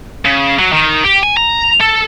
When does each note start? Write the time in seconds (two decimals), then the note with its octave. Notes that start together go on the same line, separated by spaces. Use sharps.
0.25 C#3
0.59 F#3
0.72 D#3
1.04 G4
1.23 G#5
1.37 A#5
1.81 A4